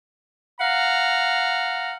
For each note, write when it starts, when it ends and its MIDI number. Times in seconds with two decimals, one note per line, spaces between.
0.60 1.96 77
0.60 1.96 78
0.60 1.96 82